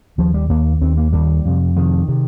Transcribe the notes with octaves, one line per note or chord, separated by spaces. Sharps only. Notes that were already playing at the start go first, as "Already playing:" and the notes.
D#2 F3
G3
D#2 A#3
D#2 C4
A#3
D#2 G3
F2 C3
F2 C3 D#3
C3